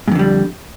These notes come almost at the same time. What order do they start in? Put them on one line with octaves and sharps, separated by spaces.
G#2 F2 D3 G3